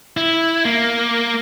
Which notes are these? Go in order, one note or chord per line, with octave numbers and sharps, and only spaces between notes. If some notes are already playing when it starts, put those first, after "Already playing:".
E4
A#3